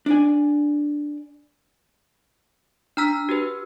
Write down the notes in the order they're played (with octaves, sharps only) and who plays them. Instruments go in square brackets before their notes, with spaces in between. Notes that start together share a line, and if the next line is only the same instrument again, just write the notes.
[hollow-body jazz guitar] D4 D5 G#5
[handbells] D4 A#5 B6 [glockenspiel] E6 F6
[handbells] F#4 G4 B4